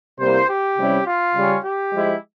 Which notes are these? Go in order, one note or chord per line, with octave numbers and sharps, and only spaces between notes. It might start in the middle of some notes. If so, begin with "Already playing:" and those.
C3 G3 A#3 E4 C5
G4
C3 G3 C#4 E4
F4
C#3 G3 C#4
G4
F3 G#3 E4